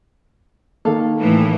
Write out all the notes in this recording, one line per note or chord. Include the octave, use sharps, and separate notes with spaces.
D#3 A#3 A4 F5
A2 E3